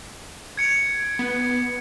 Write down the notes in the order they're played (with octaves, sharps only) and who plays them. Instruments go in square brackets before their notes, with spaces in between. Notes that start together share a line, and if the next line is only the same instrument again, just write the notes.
[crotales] G#6 C#7 D7
[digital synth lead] B3